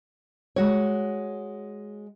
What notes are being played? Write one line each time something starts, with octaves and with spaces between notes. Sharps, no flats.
G#3 F#4 C#5